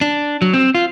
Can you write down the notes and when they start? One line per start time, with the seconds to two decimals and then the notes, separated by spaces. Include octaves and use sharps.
0.01 D4
0.42 F#3
0.54 C4
0.75 F4